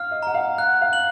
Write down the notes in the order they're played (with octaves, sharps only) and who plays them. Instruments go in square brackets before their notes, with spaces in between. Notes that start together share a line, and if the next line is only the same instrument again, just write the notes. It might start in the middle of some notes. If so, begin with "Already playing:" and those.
Already playing: [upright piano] F5 [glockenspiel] F6
[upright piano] D#5
[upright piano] F#5 [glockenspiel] A#5
[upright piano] F5
[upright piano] F#5 [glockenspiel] F#6
[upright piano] F5
[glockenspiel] F#7